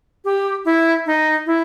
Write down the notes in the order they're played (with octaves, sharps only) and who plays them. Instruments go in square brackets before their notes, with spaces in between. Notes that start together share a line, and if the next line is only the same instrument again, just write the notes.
[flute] G4
E4
D#4
E4